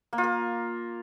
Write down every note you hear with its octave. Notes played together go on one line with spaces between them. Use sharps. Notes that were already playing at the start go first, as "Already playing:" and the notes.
A#3
F4
A#4